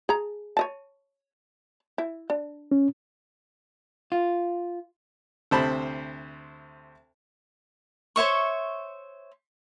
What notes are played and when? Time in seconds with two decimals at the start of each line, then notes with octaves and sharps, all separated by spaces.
0.09 G#4 A#5
0.57 C#5 D#5 A5
1.98 E4
2.30 D4
2.71 C#4
4.12 F4
5.51 D2 C3 C5 A5 B5
8.16 C5 C#5 E5 C#6